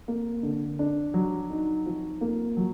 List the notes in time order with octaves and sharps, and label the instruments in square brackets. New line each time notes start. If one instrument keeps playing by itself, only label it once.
[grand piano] A#3
D3
D4
F#3
D#4
F3
A#3
F#3